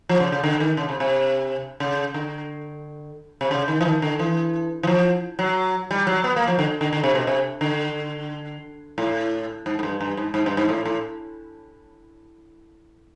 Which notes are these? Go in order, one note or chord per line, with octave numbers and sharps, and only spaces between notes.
F3
C#3
C#3
D3
D#3
C#3
C3
C3
C#3
D3
C3
C#3
D#3
E3
D#3
D3
E3
E3
F3
F#3
G3
F#3
B3
A#3
F3
D3
D3
D3
C3
B2
C3
D3
A2
G#2
G#2
G2
G2
G#2
G#2
G2
G#2
A2
A2